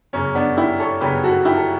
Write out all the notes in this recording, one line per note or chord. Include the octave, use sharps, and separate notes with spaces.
G1 F#2 C#3 C#4
B3 D4
E4 G4
A4 C#5
G1 F#2 C#3 G4 B4
F#4 A4
E4 G4
A4